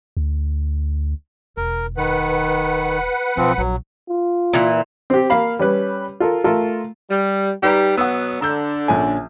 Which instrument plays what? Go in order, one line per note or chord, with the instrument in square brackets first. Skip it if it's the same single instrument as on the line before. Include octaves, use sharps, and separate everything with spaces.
[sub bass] D2
[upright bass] E1 [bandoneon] A#4
[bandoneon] D#3 [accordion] B4 F#5
[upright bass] B1 [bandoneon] F3 C4
[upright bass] A#1 [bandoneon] F#3
[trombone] F4
[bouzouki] A#2 E3
[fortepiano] C4 G4
A#3 F5 B5
G3 C#4 B4
F4 A4 A#4
A3 F4 A4 A#4
[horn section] G3
[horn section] G3 G4 [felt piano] D#4 B4 A#5
[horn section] B2 F#3 B3 [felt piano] F#5 D#6 E6
[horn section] D3 D4 [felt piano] A#5 E6 G6
[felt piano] A#1 C#4 G#5